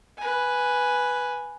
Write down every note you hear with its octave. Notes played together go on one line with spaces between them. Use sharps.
B4 G#5